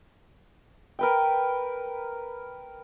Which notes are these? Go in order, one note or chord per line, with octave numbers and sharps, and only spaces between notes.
A#4 B4 G5